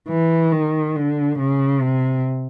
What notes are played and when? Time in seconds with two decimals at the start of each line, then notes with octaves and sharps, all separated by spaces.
0.09 E3
0.52 D#3
0.95 D3
1.39 C#3
1.82 C3